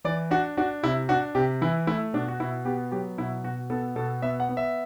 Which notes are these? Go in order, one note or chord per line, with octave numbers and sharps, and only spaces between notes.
E3 D5
D4 F#4
D4 F#4
C3 E4
D4 F#4
C3 G4
E3 E4
A3 E4
B2 D4
F#4
B2 E4
B3 G4
F#3 G4
B2 E4
B2 F#4
B3 A4
B2 A4
B3 E5
F#5
B3
E5